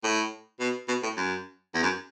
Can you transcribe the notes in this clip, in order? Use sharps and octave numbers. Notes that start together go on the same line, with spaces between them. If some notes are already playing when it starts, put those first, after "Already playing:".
A2
B2
B2
A2
F#2
E2
F#2